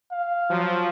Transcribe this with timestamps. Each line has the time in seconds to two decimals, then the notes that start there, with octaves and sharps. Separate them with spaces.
0.12 F5
0.50 F3 F#3